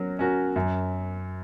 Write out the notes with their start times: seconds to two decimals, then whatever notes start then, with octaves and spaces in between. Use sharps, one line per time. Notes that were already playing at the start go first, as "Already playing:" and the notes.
Already playing: F#3 C#4 F#4 A#4
0.19 C#4 F#4 A#4
0.56 F#2